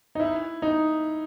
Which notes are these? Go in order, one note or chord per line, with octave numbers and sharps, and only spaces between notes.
D#4
E4
D#4